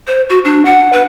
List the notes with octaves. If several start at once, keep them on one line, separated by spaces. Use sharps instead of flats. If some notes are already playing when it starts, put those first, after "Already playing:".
C5
F#4
D4
F#5
B4